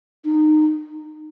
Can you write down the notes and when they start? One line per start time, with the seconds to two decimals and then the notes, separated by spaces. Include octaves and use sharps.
0.25 D#4